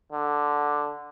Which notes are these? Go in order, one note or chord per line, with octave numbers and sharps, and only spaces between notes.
D3